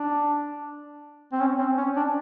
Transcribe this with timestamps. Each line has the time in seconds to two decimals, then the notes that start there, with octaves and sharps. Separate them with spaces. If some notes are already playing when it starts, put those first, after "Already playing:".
Already playing: D4
1.32 C4
1.40 C#4
1.59 C4
1.77 C#4
1.96 D4